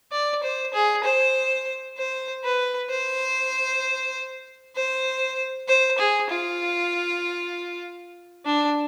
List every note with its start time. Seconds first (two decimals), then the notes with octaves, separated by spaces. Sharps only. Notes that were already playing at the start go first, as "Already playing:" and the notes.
0.12 D5
0.43 C5
0.74 G#4
1.04 C5
1.98 C5
2.44 B4
2.90 C5
4.76 C5
5.68 C5
5.99 G#4
6.30 F4
8.46 D4